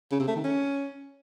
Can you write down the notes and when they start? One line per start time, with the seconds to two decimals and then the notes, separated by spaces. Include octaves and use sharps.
0.12 C#3
0.20 C3
0.28 A3
0.36 D#3
0.44 C#4